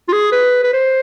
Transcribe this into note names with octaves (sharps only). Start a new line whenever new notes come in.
F4
G#4
B4
B4
C5